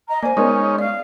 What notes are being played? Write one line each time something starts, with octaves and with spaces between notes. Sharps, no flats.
D#5 A#5
A#3 C5 D5 G#5
G#3 B3 C#4 D#4 A#4 C#5
D5 F5